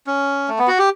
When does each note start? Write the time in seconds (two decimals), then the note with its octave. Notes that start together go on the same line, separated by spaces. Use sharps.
0.07 C#4
0.48 A3
0.59 B3
0.68 F#4
0.79 G4